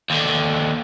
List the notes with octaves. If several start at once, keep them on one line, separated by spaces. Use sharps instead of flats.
D#2 D3